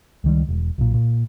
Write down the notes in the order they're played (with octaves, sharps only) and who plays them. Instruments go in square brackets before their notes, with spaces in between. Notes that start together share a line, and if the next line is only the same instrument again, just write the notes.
[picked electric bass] C#2 D#3 G3
E1
B1 A#2
A#2